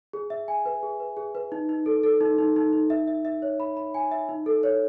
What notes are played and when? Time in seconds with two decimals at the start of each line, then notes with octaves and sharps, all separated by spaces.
0.13 G#4
0.30 E5
0.48 G#5
0.66 B4
0.83 G#4
1.00 B4
1.17 G#4
1.35 B4
1.52 D#4
1.69 D#4
1.86 A4
2.03 A4
2.21 D#4
2.38 D#4
2.56 D#4
2.73 D#4
2.90 E5
3.08 E5
3.25 E5
3.42 C#5
3.60 B5
3.77 B5
3.94 G#5
4.12 E5
4.29 D#4
4.46 A4
4.63 C#5